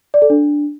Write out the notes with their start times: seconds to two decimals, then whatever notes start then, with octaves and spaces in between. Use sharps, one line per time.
0.14 D5
0.22 A4
0.30 D4